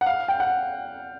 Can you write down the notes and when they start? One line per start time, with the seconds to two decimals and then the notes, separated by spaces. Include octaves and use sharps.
0.01 F#5
0.06 F5
0.28 G5
0.40 F#5